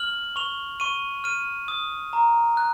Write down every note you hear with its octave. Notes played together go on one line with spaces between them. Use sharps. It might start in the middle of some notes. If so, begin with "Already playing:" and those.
Already playing: F6 F#7
C#6 F7
C#6 D#7
F6 D#7
D#6
A#5
F#6